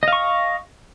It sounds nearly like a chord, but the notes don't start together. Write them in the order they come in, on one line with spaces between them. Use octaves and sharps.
D#5 F5 C#6